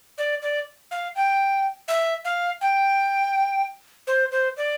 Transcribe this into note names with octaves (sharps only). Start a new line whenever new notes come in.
D5
D5
F5
G5
E5
F5
G5
C5
C5
D5